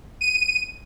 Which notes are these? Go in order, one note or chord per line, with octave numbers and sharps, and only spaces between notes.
D#7